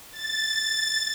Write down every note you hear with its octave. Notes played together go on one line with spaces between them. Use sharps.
A6